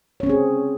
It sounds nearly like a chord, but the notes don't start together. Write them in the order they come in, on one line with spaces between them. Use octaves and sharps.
C#5 C#4 C4 G#4